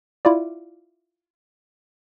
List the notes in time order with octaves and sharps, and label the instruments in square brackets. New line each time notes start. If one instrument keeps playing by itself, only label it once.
[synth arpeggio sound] E4 F4 D5